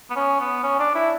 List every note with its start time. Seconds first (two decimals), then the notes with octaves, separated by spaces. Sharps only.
0.10 B3
0.16 C#4
0.40 B3
0.63 C#4
0.79 D4
0.95 E4